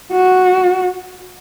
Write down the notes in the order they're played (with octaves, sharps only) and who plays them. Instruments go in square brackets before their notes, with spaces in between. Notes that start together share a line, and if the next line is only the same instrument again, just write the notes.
[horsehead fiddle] F#4